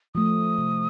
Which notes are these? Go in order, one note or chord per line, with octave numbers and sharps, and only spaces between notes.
F3 A3 D#6
C3